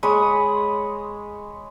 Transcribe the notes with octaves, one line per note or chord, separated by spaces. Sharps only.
G#3 C#5 B5 D#6